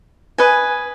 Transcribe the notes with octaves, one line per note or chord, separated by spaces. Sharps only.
B4 D#5 G#5